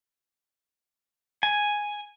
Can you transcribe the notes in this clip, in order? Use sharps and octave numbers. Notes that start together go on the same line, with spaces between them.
G#5